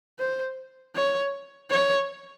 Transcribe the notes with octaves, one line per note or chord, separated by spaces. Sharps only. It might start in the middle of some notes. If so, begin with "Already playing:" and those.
C5
C#5
C#5